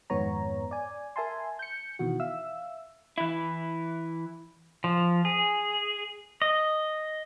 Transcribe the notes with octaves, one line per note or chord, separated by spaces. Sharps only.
F2 G#2 D#3 B3 C#5 A#5
D5 G#5
A#4 E5 G#5 A5 C6
G6 C#7
B2 D#3 E3 F#4
E5 F5 E6
E3 E4
F3
G#4
D#5